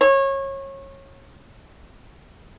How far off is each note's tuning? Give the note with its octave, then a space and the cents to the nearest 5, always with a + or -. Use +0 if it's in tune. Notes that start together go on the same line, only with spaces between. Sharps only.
C#5 -25